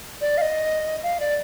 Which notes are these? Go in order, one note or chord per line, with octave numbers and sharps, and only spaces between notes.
D5
F5
D#5
F5
D5